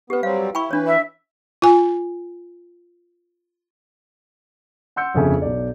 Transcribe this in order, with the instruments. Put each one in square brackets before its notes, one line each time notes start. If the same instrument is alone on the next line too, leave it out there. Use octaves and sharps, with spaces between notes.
[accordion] B3 [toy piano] G4 B4
[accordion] F#3 G3 C4 [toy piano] F5
[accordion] E4 [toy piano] G5 B5 C#6
[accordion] E3 B4 [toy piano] D4 C#5
[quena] E5
[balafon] F4 G#5
[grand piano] F#5 C6 E6 G6 C#7
G1 F2 C#3 A4 E5 G#5
B1 D5